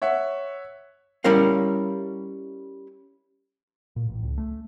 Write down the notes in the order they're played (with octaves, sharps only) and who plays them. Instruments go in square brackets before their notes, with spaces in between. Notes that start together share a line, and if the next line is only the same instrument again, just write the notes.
[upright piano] C#5 E5 F#5
[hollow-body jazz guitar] G3 C#4 E4 A#4 F5
[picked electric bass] A#2
A1
C#2
A3